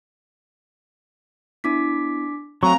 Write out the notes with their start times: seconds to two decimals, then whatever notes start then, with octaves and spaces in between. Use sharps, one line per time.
1.64 B3 D4 E4 D6 B6
2.63 F#3 A3 C4 F5 G#5 A#5 C#6